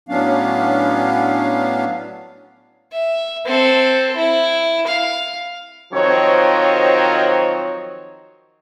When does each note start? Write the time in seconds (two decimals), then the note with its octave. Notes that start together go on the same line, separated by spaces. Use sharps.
0.09 A2 F#3 B3 C#4 D4 F5
2.93 E5
3.46 C4 A4
4.16 E4
4.87 F5
5.93 D#3 F3 F#3 C4 C#5 D#5